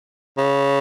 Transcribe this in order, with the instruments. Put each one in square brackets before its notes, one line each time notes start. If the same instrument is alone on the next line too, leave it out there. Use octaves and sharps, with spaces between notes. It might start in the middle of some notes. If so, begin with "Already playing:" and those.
[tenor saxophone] C#3